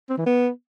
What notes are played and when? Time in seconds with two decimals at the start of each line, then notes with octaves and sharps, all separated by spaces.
0.10 C4
0.18 E3
0.26 B3